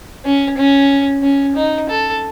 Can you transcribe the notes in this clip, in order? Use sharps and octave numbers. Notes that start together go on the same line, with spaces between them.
C#4
C#4
C#4
D#4
A4